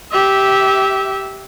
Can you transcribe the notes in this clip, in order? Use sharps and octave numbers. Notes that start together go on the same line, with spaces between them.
G4 E5